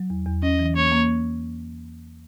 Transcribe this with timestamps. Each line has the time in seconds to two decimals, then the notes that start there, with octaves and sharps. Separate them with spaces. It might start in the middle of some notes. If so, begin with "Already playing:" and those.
Already playing: F#3
0.10 E2
0.26 E2
0.42 C#4 D#5
0.59 E3
0.75 A#3 C#5
0.92 A#3
1.07 A#3